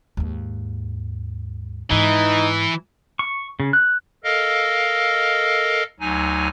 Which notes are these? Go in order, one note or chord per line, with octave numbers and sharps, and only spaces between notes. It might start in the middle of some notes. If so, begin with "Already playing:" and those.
D#2 G#2
G#2 E3 D#4
C#6
C#3
F#6
A4 A#4 D#5 F5
D2 F#3 D#4 G#5